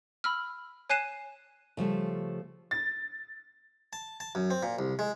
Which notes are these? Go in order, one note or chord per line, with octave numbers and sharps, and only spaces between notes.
B5 E6 F6
C#5 G#5 F#6 C7 D#7 E7
C#3 F3 G3 A3
A6
A5
A5
F#2
C4
A#2
C2
G#3